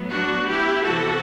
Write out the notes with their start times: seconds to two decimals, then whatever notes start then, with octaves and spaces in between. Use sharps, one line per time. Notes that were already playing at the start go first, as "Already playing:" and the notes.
Already playing: A2 F#3 B3
0.11 D4 F#4
0.48 E4 G4
0.84 E2 C3 E3 F#4 A4